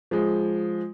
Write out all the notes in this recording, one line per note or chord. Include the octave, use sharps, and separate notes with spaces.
F3 G#3